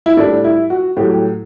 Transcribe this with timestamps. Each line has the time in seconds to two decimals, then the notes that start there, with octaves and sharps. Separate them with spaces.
0.06 E4
0.17 A2 G3 D4
0.44 E4
0.70 F#4
0.97 A2 F#3 G4